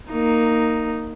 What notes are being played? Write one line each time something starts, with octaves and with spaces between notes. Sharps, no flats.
A#3 D#4